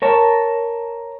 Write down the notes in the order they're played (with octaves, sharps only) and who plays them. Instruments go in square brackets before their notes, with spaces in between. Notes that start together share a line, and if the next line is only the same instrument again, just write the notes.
[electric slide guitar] A#4 C#5 A5